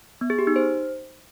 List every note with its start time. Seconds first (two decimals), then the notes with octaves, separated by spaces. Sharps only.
0.21 B3
0.30 G#4
0.39 G4
0.47 D#4
0.56 C5